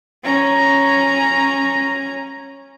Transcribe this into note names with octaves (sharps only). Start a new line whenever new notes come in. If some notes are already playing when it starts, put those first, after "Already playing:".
C#4 A#5